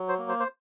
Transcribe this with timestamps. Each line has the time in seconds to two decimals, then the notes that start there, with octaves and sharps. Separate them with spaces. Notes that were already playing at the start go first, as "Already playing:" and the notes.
Already playing: F#3
0.09 C5
0.19 A#3
0.29 C5
0.40 C5